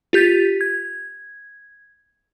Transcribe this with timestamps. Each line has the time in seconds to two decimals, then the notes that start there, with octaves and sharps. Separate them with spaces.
0.13 F4 G4 G6 A6 B6
0.61 G#6